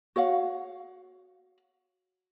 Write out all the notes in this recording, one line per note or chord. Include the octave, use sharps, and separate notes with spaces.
F#4 C#5 F5 F#5